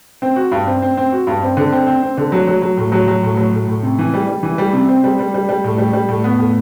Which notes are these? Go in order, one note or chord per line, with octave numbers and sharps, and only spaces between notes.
C4
F#4
G2
C4
C4
C4
F#4
G2
C4
D3
C4
C4
C4
D3
F#3
F#3
F#3
A2
F#3
F#3
A2
F#3
A2
A2
C3
E3
G3
G3
E3
G3
C3
C4
G3
G3
G3
G3
A2
G3
G3
A2
B3
A2